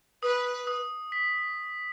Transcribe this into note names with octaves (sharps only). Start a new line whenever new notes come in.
B4 D#6
D#6
B6